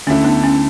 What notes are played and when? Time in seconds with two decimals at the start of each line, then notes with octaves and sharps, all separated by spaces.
0.07 D2 D3 A3 C#4 E4
0.25 B3 D4
0.43 C#4